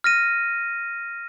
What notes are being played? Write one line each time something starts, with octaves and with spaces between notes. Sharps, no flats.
F6 A#6 D#7